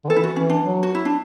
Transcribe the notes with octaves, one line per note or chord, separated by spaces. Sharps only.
D3
E3 A4
E4
F#4
E3 C#4
D4
F#3
F#4
E4
D4